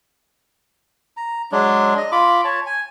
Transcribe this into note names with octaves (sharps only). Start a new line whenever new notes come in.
A#5
F#3 G#3 D4
D#5
F4 B5 D6
C#5 A5
G#5